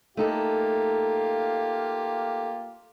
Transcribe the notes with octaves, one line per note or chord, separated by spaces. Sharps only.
A3 A#3 D#4 F4 G4 A4